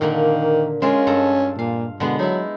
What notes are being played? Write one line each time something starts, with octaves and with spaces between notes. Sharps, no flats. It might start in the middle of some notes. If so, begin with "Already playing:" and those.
A#2 D3 D#3 A#3
G#3 C#4 F4 A#4
G2 A4 A#5
A#2 F5
B2 D3 G#3 B3
F#3 D#4 E4